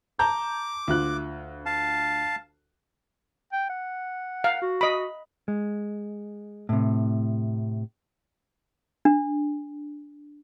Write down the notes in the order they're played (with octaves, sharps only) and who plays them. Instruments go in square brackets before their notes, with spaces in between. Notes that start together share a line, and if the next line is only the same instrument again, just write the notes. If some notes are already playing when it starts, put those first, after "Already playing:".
[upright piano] A5 A#5 G6 [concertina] D6
[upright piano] D2 F4 F#6
[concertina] F5 A5
[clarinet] G5
F#5
[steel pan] F5
[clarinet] F#4
[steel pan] D#5 B5
[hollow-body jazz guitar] G#3
A2 C3
[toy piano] D4